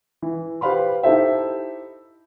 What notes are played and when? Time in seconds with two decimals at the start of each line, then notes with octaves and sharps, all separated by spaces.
0.22 E3
0.61 G4 B4 C5 F5 B5 C6
1.03 D#4 E4 G4 A4 C5 E5